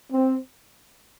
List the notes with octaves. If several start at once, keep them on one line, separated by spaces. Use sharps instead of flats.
C4